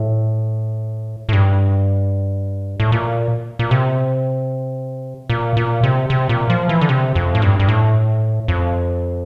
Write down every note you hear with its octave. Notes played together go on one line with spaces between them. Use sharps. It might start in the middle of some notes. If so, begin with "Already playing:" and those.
Already playing: A2
A2
G2
A2
A#2
A#2
C3
A#2
A#2
C3
C3
A#2
F3
E3
D3
C3
F2
A2
G2
G2
A2
F2